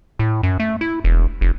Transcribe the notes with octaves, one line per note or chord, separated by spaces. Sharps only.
A2
F#2
A3
E4
E1
F1